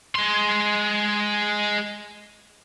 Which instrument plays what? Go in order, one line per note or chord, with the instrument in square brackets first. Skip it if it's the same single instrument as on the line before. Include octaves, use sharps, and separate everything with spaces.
[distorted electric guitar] G#3 C6